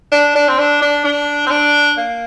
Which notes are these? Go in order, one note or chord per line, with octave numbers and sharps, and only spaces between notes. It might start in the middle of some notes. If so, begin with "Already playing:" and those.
D4
D4
C4
D4
D4
D4
C4
D4
A#3